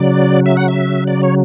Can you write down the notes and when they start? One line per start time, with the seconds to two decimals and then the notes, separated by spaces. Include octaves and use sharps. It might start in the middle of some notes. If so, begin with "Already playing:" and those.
Already playing: C#3 F#3 D5
0.46 E5
0.57 F#5
0.68 E5
1.07 D5
1.23 C#5